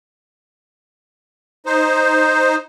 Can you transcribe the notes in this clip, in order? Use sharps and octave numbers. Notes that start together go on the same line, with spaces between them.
D#4 C5